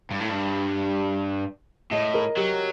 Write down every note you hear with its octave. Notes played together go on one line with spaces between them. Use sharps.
G2
A2
G2
A2 D#5
A#4
F#3 G4